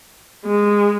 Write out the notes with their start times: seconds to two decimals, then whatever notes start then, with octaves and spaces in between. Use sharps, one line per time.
0.46 G#3